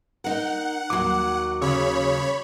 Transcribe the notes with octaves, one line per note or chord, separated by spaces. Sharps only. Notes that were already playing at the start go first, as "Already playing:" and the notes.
D#4 A#4 F#5
D#2 F#3 D6
C#3 C#5 B5